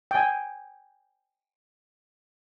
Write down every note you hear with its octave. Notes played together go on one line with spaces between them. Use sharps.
G5 G#5